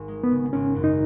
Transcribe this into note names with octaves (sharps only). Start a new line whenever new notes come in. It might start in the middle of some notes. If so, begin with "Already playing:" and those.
Already playing: G#1
G#3
B3
C#3
G#1 C#4
F#2
D#4